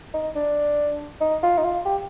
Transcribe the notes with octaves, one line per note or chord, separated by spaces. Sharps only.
D#4
D4
D#4
F4
D#4
F4
G4